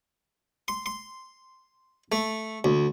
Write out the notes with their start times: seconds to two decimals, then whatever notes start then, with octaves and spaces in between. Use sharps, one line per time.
0.68 C6
0.86 C6
2.12 A3
2.64 D2